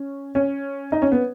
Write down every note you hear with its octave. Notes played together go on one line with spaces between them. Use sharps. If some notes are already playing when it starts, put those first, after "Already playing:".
Already playing: C#4
C#4
D#4
C#4
B3